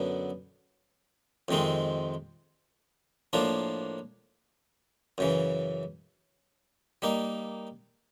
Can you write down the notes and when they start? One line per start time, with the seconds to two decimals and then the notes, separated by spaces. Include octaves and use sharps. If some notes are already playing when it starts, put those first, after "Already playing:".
Already playing: F#2 D3 F#3 B3
1.48 F2 C3 D#3 G#3 C4
3.33 A2 F3 A#3 D4
5.18 F#2 C#3 E3
7.02 G3 A#3 D#4